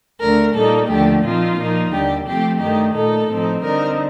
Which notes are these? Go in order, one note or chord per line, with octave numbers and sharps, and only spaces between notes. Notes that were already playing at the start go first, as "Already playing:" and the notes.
D2 D3 A3 A#4
A#2 G3 A#3 D#4 A4
D#2 D3 F3 A3 G4
A#2 F3 C4 D#4 F4
A#2 F3 A#3 D#4
D#2 D3 G3 G4
C3 F3 A3 C4 G4
G2 D#3 A3 D#4 G4
A#2 A3 D#4 A4
A2 F3 C4 D#4
D3 G3 C4 D#4 A#4